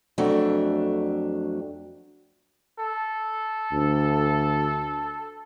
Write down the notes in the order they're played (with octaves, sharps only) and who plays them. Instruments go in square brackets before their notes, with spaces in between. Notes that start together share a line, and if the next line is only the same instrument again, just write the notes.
[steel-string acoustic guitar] F2 F#3 A3 D4
[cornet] A4
[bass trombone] D2